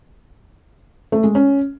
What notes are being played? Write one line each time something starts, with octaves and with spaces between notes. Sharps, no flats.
A3
G#3
C#4